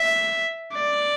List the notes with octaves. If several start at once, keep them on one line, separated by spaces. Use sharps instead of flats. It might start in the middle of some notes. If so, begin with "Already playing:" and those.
Already playing: E5
D5